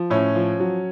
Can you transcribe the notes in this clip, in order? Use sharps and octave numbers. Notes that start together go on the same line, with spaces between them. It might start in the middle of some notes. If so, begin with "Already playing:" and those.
Already playing: F3
A2 C#4
F3
F#3